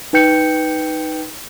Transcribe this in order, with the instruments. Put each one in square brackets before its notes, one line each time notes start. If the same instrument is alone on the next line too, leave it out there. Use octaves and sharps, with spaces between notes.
[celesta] D#4 B4 G5 G6 C#7